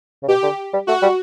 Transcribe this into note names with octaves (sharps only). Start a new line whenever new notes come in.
C#3
B2 G4
D3
G3
A3 F#4
G3